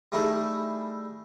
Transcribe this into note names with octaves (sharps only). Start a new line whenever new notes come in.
G3 A3 D#4 E4 G#4 A4